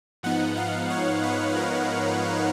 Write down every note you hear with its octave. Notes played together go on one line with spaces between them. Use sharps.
G#2 F3 B3 D#4 F#5
F5
C#5
B4
A#4